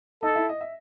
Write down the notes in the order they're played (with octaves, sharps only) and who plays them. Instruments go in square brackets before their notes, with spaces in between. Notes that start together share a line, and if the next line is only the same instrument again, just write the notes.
[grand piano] D#4 D#5 [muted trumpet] A4
[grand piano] E4 E5
D#5
E5